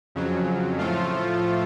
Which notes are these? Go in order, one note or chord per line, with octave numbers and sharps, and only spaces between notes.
F2 C#3 F#3
A2 F3 A3 F4